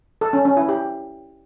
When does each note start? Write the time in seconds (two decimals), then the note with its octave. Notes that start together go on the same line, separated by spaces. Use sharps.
0.21 A4
0.33 C#4
0.45 C#4
0.57 E4
0.69 G4